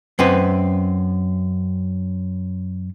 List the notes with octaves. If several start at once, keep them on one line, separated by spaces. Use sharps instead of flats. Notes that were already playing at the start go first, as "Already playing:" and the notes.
F#2 C4 B4